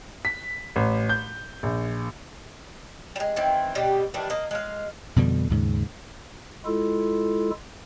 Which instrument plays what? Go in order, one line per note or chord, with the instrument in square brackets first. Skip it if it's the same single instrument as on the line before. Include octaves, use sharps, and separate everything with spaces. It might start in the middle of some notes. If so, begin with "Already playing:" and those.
[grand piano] B6
A1
G6
A#1
[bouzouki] G3 G#3
D#3 E3 C4
B2 G3 G4
D#3 E3 G3 D4
A#3 D#5
G#3 F5
[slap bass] F2 B2 D3 G3
D#2 G#2 C#3
[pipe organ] G#3 E4 F4 A4